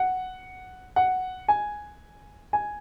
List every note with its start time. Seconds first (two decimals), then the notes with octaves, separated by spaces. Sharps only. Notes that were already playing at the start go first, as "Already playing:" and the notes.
Already playing: F#5
0.96 F#5
1.48 G#5
2.53 G#5